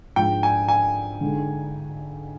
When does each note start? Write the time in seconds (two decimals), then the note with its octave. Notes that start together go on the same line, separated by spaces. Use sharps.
0.16 G#2 F3 G#3 D4 F4 G5
0.43 G#5
0.68 G#5
1.21 D3 G#3 D#4